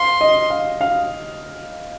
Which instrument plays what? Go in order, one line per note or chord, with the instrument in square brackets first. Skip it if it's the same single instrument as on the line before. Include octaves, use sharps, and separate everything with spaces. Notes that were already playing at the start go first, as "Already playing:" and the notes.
Already playing: [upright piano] F5 [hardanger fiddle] C6
[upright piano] D#5
F5
F5